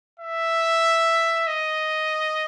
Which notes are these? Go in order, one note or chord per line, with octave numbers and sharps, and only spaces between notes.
E5
D#5